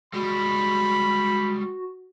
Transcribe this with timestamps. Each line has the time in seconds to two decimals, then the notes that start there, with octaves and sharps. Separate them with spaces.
0.13 G3 G#3 F#4 B5